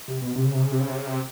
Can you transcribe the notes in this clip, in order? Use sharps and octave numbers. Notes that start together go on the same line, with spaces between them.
C3
B2
C3
C#3
C3
C#3
C3
C#3
C3
C#3
C3